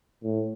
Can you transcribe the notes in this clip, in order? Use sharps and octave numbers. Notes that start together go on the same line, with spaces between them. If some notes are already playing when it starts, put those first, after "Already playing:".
A2